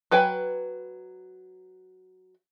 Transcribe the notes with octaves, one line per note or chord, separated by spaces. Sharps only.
F#3 B4 G5 G#5